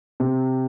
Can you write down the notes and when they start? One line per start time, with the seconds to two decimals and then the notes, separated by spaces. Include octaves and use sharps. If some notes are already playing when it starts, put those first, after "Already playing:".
0.20 C3